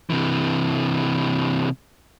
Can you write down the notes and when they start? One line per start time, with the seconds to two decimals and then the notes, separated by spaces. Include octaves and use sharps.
0.10 C3 E3